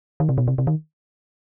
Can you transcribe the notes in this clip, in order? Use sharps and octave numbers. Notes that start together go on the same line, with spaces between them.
D#3
C3
B2
C3
C3
D#3